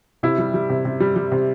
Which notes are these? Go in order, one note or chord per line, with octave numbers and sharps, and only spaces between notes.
C3 E4
G3
G3
C3
C3
G3
G3
C3